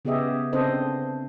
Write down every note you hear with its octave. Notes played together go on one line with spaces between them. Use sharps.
C#3 B3 G4 G#4 D#5 E5
C#3 C4 D4 A4 C5 D#5